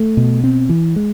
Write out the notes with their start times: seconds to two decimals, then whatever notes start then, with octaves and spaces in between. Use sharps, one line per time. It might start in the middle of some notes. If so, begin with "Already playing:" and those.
Already playing: A3
0.17 B2
0.44 C4
0.69 E3
0.96 G#3